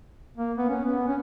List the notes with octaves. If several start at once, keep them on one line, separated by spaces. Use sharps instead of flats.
A#3
B3
C#4
B3
C#4